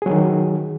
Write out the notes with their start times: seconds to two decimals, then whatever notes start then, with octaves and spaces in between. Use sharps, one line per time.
0.02 G#4
0.06 F#3
0.10 D#3